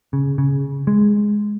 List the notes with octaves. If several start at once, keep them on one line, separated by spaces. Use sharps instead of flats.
C#3
C#3
G#3